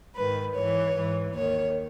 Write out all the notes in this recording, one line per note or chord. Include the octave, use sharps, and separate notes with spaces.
G#2 D#3 B4
G#2 E3 C#5
G#2 E3
D#2 D#3 C#5